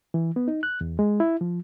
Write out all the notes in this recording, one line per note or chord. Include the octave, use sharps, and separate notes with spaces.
E3
B3
D#4
F#6
E2
G#3
E4
F3